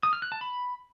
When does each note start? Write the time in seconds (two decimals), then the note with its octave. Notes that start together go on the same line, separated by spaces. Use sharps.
0.03 D#6
0.13 F6
0.22 F#6
0.32 A5
0.41 B5